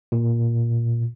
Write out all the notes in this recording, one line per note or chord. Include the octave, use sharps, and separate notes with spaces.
A#2